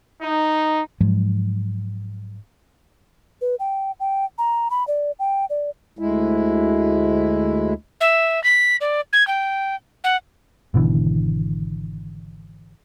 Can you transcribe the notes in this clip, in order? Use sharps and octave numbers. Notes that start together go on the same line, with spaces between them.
D#4
G#2 F3 F#3 G#3
B4
G5
G5
A#5
B5
D5
G5
D5
D2 G#3 E4
E5
B6
D5
G#6
G5
F#5
G#1 B2 D3 E3